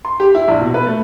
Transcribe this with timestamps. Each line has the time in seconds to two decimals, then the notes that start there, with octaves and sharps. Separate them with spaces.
0.05 C6
0.20 G4
0.35 E4
0.48 A#1
0.61 B2
0.74 B4
0.87 A3